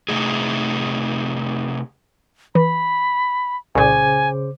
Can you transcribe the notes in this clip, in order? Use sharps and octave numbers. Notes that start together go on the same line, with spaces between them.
C3 A3 D#4 G#4
E3 B5
C2 A#2 C#3 C5 G#5 D6